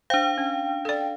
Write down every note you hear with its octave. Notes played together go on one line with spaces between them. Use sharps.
D4 C5 F5 G5
C#4
A4 D5